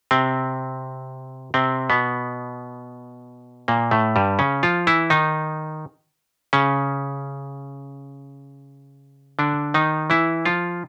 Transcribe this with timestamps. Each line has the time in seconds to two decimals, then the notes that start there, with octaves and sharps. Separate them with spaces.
0.11 C3 C4
1.54 C3 C4
1.90 B2 B3
3.68 A#2 A#3
3.91 A2 A3
4.16 G2 G3
4.39 C#3 C#4
4.63 F3 F4
4.87 E3 E4
5.10 D#3 D#4
6.53 C#3 C#4
9.39 D3 D4
9.74 D#3 D#4
10.10 E3 E4
10.45 F3 F4